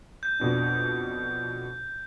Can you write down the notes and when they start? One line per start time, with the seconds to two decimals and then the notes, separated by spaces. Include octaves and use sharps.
0.23 G6
0.40 F2 B2 D4